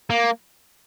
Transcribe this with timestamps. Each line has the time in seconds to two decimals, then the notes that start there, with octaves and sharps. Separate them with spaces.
0.10 A#3